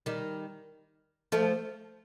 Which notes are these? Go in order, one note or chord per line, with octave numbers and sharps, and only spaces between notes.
D#3 G3
F3 A3